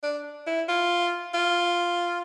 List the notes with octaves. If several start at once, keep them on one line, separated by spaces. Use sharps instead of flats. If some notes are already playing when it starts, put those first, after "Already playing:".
D4
E4
F4
F4